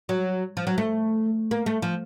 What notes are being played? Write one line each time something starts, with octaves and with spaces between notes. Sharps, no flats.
F#3
F3
F#3
A3
A#3
A3
F3